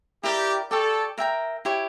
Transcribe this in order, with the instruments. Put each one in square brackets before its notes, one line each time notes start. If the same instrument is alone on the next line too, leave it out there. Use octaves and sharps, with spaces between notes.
[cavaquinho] E4 A#4 D5 [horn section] G4
[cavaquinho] G4 D5 G5 C#6 [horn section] A4
[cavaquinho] A#4 E5 G5 A#5
E4 G4 C#5